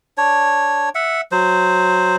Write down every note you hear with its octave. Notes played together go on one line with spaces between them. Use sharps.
D4 C#5
E5 F#5
F#3 C5